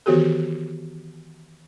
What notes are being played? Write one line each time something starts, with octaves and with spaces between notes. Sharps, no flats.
D#3 E3 B3 F#4 G4 A4